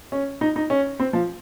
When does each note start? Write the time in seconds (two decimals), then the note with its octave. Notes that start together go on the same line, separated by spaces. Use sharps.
0.12 C#4
0.41 D#4
0.56 D#4
0.70 C#4
0.99 C4
1.13 F3